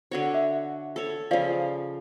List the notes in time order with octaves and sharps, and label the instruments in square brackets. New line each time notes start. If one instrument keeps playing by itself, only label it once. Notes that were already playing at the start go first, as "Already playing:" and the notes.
[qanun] D3 F#4 C#5
[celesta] E5
[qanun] A4 C#5
[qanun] C#3 F3 [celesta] D5 F5